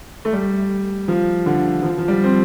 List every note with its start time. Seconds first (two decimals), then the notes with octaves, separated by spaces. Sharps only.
0.25 A3
0.33 G3
1.08 F3
1.46 D3
1.82 F3
1.98 F3
2.08 G3
2.24 C4